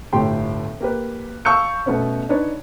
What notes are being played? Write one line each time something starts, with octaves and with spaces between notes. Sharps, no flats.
G1 A2 A3 G4 G5 C6
A#3 G4 B4
F5 A5 C#6 E6 G6 C#7
B2 A3 B3 C#4
D4 D#4 B4 C#5